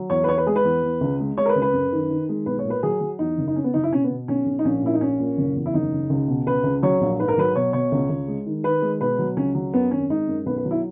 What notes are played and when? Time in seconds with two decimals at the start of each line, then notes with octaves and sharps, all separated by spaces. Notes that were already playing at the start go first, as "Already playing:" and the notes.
Already playing: F#3
0.10 E2 C#5
0.24 B4
0.28 E2 C#5
0.38 B4
0.46 G#3 G#4
0.56 B4
0.64 E2
0.83 E2
1.01 C#2
1.20 G#3
1.38 G#3 C#5
1.46 A#4
1.49 B4
1.56 C#2
1.62 B4
1.73 F#2
1.92 D#3
2.10 D#3
2.29 G#3
2.46 B1 B4
2.59 C#5
2.65 A#2
2.70 B4
2.83 F#3 G#4
3.00 F#3
3.19 E2 D#4
3.38 F#1
3.48 D#4
3.56 C#3 C#4
3.64 B3
3.74 F#1 D#4
3.83 E4
3.92 B2 C#4
4.04 B3
4.10 B2
4.28 B1 C#4
4.46 B1
4.59 D#4
4.65 A#1 C#4
4.83 A#2 E4
4.94 D#4
5.01 A#1 C#4
5.20 A#2
5.38 F#1
5.55 E2
5.66 E4
5.74 F#1 D#4
5.92 C#3
6.10 C#2
6.28 B2
6.47 C#2 B4
6.64 C#2
6.82 F#3 C#5
7.01 A#1
7.19 G#2 B4
7.28 A#4
7.38 F#3 B4
7.55 B2 C#5
7.73 B2 C#5
7.92 C#2
8.10 C#2
8.28 G#3
8.46 D#3
8.64 D#3 B4
8.82 G#3
9.01 B2 B4
9.19 F#3
9.37 C#2 C#4
9.55 F#3
9.74 F#2 B3
9.91 G#1 C#4
10.10 G#3 D#4
10.28 F#2
10.46 B1 B4
10.58 B4
10.65 F#3
10.71 E4